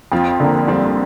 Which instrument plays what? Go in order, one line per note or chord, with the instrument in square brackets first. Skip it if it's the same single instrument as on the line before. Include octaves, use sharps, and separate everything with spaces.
[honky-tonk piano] F2 [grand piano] C4 F4
[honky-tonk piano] D3 A#3
[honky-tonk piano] F2 [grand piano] G3 C4